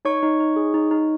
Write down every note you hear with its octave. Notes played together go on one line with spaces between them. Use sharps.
D#4 C#5 C#6
D#4
D#4
G#4
D#4
D#4